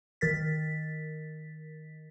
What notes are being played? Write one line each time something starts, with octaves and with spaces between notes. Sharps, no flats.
D#3 A#4 A6 B6